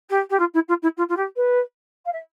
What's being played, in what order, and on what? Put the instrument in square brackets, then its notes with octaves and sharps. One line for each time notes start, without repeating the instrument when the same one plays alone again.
[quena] G4
G4
F4
E4
F4
E4
F4
F4
G4
B4
F5
E5